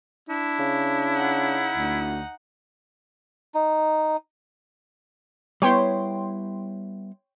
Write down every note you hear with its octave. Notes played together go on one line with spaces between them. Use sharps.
D4 E4
C#3
D#4 F#5
D2
D#4
G3 B3 E4 C#5 G5 C6